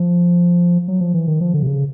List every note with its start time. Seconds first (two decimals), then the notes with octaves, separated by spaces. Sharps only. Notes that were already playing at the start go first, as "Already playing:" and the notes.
Already playing: F3
0.88 F#3
1.00 F3
1.14 E3
1.27 D#3
1.41 F3
1.54 D3
1.63 C3
1.67 C#3